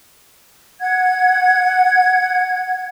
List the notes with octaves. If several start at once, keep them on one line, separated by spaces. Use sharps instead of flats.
F#5 G#6